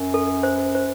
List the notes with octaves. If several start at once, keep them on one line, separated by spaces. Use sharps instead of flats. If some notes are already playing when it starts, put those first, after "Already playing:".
Already playing: F#2
A4
C5
C5